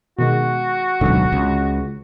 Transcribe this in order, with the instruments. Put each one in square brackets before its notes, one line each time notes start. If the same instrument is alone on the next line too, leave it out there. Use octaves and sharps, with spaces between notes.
[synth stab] B2 D#3 G#3 [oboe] F#4
[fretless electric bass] D1 B1 [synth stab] G#2 D3
[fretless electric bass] C#2